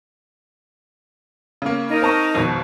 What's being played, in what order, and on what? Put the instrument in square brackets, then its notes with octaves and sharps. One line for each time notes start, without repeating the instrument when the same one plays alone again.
[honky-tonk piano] C#3 A#3
[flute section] D#4 A#4
[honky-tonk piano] C4 A5 C#6
G#1 F2 B2